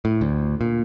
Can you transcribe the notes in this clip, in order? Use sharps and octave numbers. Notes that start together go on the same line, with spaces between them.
A2
D2
A#2